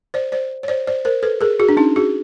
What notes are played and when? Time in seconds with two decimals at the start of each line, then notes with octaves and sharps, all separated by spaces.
0.14 C5 D5
0.32 C5 D5
0.63 C#5
0.68 C5 D5
0.87 C5 D5
1.05 A#4 C5
1.23 A4 B4
1.41 G#4 A#4
1.60 F#4 G#4
1.69 D4
1.77 C#4 D#4
1.96 F#4 G#4